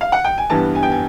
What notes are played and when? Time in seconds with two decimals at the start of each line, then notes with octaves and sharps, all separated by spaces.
0.01 F5
0.12 F#5
0.25 G5
0.38 G#5
0.50 G2 E3 G3 B3 A5
0.75 G#5
0.83 G5
0.91 G#5